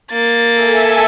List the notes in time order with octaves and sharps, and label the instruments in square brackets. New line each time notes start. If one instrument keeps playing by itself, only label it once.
[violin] A#3 A6
[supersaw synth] A4 E5 G#5